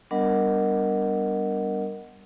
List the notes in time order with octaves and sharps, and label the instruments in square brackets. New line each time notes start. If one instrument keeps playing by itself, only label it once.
[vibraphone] G3 B3 D4 A#4 D#5 F#5